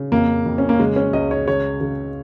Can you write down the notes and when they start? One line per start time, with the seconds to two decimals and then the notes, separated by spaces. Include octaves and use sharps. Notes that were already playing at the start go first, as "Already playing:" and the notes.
Already playing: C#3
0.12 F2 A#3
0.46 F2
0.58 C#4
0.69 A#3
0.79 C#3 G#3
0.96 C#4
1.13 C#2 D#5
1.31 C#5
1.47 C#3 C#5
1.81 C#3